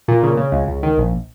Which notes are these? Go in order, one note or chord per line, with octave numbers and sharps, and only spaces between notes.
A#2
C#3
C#3
C#2
C#2
D#3
A#1